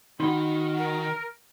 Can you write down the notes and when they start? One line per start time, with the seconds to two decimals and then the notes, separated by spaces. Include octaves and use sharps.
0.20 D#3 D#4 F#4 B5 C6
0.79 A#4